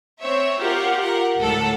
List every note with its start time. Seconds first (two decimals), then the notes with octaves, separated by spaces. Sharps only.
0.21 C4 C#5 E5
0.59 F4 G4 A#4 F#5
1.01 A#4 F#5
1.40 D2 A2 A4 F#5